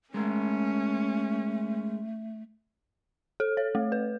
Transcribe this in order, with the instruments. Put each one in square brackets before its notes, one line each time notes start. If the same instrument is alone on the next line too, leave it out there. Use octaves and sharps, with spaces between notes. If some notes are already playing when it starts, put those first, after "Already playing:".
[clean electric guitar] G#3 A#4 [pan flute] A3 [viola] C#4
[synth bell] A4
C#5
A3
B4